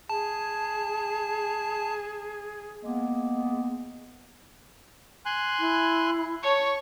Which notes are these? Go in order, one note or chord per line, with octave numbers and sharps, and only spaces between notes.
G#4 A5
G#3 A#3 B3
G#5 C6 F#6
E4
C#5 A5 C#6